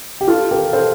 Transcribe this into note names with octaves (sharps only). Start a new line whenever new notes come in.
G4
F4 A4
G4 A#4
A4 C5